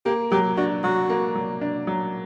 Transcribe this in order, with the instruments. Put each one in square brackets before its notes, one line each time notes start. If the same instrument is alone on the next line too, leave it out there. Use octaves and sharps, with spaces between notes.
[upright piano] A#3 [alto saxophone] G4
[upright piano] F#3 [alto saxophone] G4
[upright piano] D4 [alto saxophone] F#4
[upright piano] F#3 [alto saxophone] F#4
[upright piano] A#3
F#3
D4
F#3